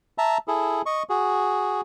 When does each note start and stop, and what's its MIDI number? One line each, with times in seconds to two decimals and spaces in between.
0.18 0.38 76
0.18 0.38 81
0.18 0.38 82
0.48 0.82 64
0.48 0.82 68
0.48 0.82 69
0.86 1.03 75
0.86 1.03 85
1.09 1.81 66
1.09 1.81 68